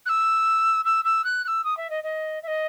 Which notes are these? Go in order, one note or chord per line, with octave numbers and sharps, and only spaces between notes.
F#6
E6
E6
E6
F#6
F#6
E6
D#6
E5
D#5
D#5
E5
D#5